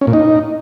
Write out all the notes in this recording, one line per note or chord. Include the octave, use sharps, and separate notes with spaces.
C#4
A#2
D#4